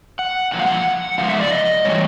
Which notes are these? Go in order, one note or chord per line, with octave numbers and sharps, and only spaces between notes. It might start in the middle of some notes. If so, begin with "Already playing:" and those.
F#5
A#2 F3 F#5
F5
F#5
C#3 F3 G#3 F5
E5
D5
D#5
A2 E3 G3 C#5